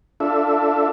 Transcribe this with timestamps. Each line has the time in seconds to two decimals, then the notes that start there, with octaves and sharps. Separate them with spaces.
0.20 D4 F4 A4 E5